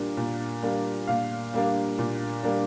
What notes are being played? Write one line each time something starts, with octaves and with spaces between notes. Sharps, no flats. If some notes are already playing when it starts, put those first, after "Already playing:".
Already playing: A#2 G3 A#3 D4
A#2
G3 A#3 D4
A#2 F5
G3 A#3 D4
A#2
G3 A#3 D4